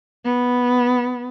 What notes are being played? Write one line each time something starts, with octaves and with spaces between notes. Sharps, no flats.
B3